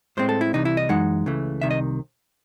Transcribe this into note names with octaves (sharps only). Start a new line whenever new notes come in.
A2 G#3 C4 C5
A4
E4
C2 C3 E3 D#4
E4
D#5
F#2 E3 G#3 D#4 F#5
C#2 C#3 E3 A3
C2 C3 D#3 E5
D#5